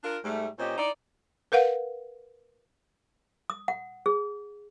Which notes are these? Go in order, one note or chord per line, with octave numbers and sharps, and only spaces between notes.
D4 F4 A#4
G#2 G3 A3
A#2 C#4 G4 C5 D#5
D#4 E4 D5
A#4 B4 F5 F#5
D#6
F#5
G#4